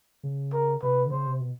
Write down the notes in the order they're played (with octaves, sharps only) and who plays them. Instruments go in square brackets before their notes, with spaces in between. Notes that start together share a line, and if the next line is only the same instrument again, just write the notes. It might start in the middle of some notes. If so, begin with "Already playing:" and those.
[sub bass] C#3
[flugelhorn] A#4
[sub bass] C3 [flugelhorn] B4
[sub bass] D3
[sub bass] C#3 [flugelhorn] C5
[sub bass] C3
B2